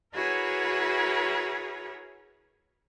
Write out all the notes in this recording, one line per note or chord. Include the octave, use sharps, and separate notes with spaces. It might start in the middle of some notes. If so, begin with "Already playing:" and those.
E4 F#4 G#4 A#4 B4 C#5